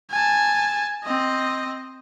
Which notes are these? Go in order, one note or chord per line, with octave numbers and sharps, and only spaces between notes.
G#5 A5
C4 D#5